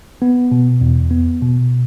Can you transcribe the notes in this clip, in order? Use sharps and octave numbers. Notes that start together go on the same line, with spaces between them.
B3
B2
E2
B3
B2